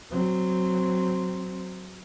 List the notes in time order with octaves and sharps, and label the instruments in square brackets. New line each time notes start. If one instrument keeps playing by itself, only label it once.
[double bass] F#3 C4